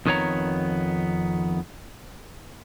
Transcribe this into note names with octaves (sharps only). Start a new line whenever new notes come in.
F2 D#3 G#3 B3 C#5 A#5